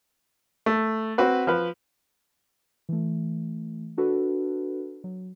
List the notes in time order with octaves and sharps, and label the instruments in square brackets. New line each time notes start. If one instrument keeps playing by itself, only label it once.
[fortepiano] A3
C4 F#4 B4
F3 B4
[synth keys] E3 A3
D4 F#4 A4 B4
F#3